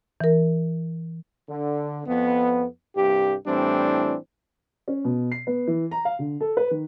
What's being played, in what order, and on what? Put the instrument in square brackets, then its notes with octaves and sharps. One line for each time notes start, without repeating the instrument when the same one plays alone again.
[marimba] E3 A#4
[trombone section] D3
F2 B3
C2 G2 G4
A2 E3 G3 C4 D4
[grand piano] C#4
B2
C7
B3
E3
A#5
F5
D3
A4
B4
D#3